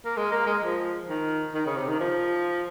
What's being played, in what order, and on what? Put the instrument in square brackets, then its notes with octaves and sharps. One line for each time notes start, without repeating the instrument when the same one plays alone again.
[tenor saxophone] A#3
G#3
A#3
G#3
F3
D#3
D#3
C#3
C3
D#3
F3